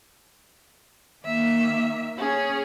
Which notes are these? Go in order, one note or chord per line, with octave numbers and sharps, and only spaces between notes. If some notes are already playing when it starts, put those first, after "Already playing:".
D#3 A#3 E5
C#4 G#4 C#5